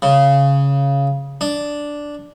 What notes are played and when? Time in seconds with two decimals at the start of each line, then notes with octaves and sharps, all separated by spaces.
0.02 C#3
1.41 D4